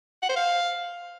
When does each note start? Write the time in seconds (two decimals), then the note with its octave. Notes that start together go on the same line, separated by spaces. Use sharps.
0.22 F#5
0.29 C5
0.36 F5